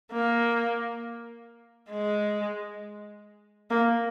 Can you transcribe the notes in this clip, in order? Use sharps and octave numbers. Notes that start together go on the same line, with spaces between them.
A#3
G#3
A#3